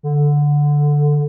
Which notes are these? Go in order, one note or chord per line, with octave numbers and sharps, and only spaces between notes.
D3